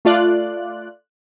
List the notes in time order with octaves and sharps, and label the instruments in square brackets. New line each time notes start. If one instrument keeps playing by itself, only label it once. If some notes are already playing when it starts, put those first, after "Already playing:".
[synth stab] A3 F4 D5 F#6